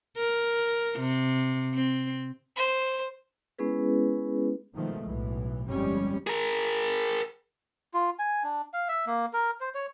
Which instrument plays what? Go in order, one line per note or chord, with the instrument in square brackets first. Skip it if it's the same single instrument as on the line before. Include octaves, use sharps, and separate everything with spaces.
[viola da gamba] A#4
C3
C4
[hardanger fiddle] C5
[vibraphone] G#3 B3 C#4 E4 G#4 B4
[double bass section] B2 D#3 F3 G#3 A3
B1 A2 E3
G1 F2 G3 G#3 C#4
[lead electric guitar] G#4 A#4
[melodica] F4
G#5
D4
F5
E5
A#3
A#4
C5
C#5